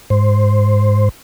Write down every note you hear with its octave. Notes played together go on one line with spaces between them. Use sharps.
G#2 C5